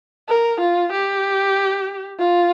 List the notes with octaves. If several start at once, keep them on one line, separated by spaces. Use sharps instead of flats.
A#4
F4
G4
F4